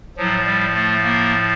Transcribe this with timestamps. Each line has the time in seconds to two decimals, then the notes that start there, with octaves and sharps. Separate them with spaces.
0.17 A2 F3 F#3
0.46 G3
0.74 A3
1.03 A#3